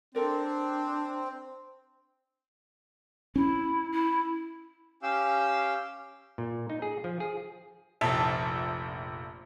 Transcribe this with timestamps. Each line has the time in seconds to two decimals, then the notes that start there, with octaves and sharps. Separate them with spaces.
0.15 C4 D4 A4 A#4 D5
3.36 C#4 E4
3.92 E4
5.03 C#4 G4 F5 G5 E6
6.38 A#2
6.70 D#4
6.82 G#4
7.04 F3
7.20 G#4
8.01 F1 A#1 E5 A5